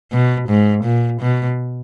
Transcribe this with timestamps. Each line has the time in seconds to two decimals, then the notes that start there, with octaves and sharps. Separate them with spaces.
0.12 B2
0.49 G#2
0.84 A#2
1.20 B2